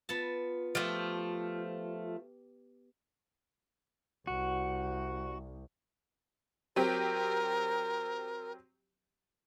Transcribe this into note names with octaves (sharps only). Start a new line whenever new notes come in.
B3 F4 A5
F3 A3 G4
C2 F#4
F#3 C4 G4 A#4